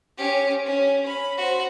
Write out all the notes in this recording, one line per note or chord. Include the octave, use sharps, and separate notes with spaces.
C#4 G4
C#4
B5
F#4 C5